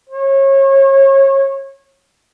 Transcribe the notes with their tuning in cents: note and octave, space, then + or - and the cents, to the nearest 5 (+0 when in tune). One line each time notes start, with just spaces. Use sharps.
C#5 -30